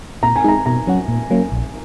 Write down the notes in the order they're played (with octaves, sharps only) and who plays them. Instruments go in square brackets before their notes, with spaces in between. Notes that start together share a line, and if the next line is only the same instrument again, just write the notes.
[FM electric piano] A#2 [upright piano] A#5
[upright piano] G#5
[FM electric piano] G#3 D#4 G#4 [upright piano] A#5
[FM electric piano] B2 [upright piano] A#5
[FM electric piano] F#3 C#4 F#4
A#2
F#3 A#3 C#4
A#1